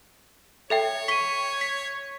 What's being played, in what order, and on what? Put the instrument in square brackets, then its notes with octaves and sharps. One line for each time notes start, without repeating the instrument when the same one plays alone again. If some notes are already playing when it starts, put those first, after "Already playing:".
[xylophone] A4 E5 G5 [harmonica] C#5
[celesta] C#6 D#7 [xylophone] B6 G7
[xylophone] B6